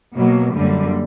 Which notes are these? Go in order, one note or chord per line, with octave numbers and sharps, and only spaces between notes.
B2 F#3 A#3
F#2 D3 G3 A#3